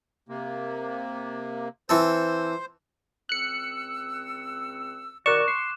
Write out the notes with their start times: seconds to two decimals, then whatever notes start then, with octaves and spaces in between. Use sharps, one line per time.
0.29 C3 A#3
1.89 E3 C4 A4 C5
3.29 C#2 C4 E6 F#6 C#7
5.26 D#3 F#4 A#4 D5 C#6 D6 F#6 E7
5.48 C6 C7